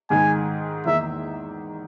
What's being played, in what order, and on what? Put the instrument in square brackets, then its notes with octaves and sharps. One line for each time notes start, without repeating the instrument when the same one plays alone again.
[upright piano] G#2 D#3 G#3 [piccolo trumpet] G#5
[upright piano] E2 D#3 A#3 D#4 [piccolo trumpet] E5